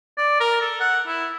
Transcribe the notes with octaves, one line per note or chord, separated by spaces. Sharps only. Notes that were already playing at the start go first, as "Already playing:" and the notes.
D5
A#4
A4
F#5
E4